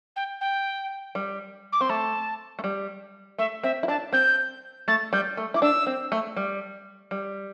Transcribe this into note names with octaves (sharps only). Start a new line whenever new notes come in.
G5
G5
G3
D6
C4 C6
A3 A5
A3
G3
A3 E5
C4 E5
E4
D4 A5
C4 G6
A3 A6
G3 G6
A3
E4 D6
D4 E6
C4
A3
G3
G3